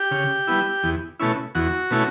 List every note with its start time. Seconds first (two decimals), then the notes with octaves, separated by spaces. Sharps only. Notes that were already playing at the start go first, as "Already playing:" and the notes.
Already playing: G4
0.11 C#3
0.47 G3 B3 E4
0.83 E2
1.20 B2 A3 C#4 E4
1.55 E2 F#4
1.91 B2 A3 C#4 E4